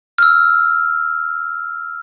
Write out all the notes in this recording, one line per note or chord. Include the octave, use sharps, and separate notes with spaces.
E6 F6